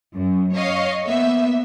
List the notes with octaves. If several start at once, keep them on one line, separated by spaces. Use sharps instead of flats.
F#2
C#5 D#5 F5
A#3 B3 E5